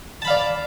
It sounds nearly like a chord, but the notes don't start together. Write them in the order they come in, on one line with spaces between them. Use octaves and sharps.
A5 B5 F5 D5